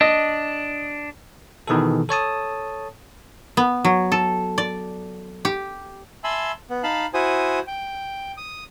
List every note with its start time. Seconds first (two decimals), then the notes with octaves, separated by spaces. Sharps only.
0.01 D4 D#5
1.68 B2 D#3 E3 D#4 G#4 A4
2.09 A4 C#5 A5 D#6
3.57 B3
3.85 F#3
4.12 A4
4.58 D5
5.45 G4
6.24 E5 G#5 A5 B5 C6 E6
6.70 B3
6.83 D#4 F5 A5 B5
7.14 E4 F#4 C5 G#5 D#6
7.67 G5
8.37 D#6